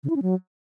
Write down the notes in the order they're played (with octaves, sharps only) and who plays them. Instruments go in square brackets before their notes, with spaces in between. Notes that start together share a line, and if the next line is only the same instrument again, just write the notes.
[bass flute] C#3
E4
C#4
F#3